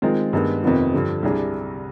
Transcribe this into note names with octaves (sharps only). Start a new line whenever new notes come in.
D#3 G#3 C4 F4
G2 D#3 G#3 B3
F2 C3 D#3 B3 F4
G2 D3 F3
C2 C3 G3 D4 G#4